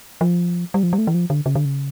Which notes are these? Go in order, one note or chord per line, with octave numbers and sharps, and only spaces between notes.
F3
G3
F3
G3
A3
E3
F3
D3
C#3
D3
C#3